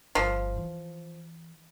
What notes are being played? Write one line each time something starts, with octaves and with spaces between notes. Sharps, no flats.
G1 F3
E3